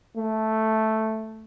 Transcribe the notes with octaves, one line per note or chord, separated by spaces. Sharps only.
A3